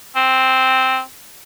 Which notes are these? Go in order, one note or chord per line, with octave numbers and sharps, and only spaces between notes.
C4